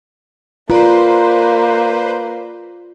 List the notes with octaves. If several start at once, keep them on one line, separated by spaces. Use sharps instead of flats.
A#3 F4 B4 C5 D5 A#5